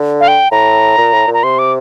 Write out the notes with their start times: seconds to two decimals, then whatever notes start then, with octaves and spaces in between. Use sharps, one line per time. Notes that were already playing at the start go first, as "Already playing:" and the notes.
Already playing: D3
0.20 F5
0.28 G5
0.51 A2 A#5
0.97 A#2
1.13 A2
1.27 A#2
1.34 A#5
1.43 C3 C6
1.59 D6